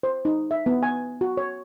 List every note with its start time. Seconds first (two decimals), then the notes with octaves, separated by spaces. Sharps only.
0.03 C5
0.25 D#4
0.51 E5
0.66 B3
0.83 G#5
1.21 F#4
1.37 C#5